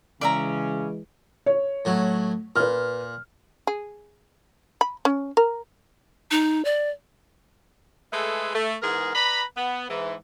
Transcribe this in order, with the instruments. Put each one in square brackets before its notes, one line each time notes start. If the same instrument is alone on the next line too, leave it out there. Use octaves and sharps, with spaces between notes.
[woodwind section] C#3 C#4 [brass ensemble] E3 G#3 [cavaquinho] D5 E5 A#5
[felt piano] C#5
[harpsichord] A2 F#3
[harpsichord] A#2 [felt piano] B4 F6
[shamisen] G#4
B5
C#4
A#4
[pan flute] D#4
D5
[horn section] G#3 A3 G#4 A4 B4
A3
G#2 E3 B3 G#4 A#4
B4 D5 A#5 B5
B3
G#2 E3